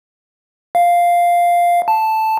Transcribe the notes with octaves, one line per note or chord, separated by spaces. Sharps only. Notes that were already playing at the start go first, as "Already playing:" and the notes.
F5
A5